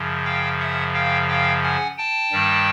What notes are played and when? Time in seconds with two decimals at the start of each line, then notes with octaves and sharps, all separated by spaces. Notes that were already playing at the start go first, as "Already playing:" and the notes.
Already playing: F#2 C#3 F3
0.25 F5 G5
0.60 E5 F#5
0.94 F5 G5
1.28 F5 G5
1.63 F#5 G#5
1.97 G5 A5
2.32 G2 D#3 G3